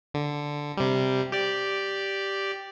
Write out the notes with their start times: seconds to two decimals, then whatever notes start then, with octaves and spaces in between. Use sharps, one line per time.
0.14 D3
0.77 C3 G3
1.32 G4 D5